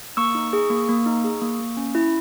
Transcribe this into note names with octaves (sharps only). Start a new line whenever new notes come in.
A#3 C#6 E6
D#4
G#4
A#3
A#3
D#4
G#4
A#3
A#3
C#4
E4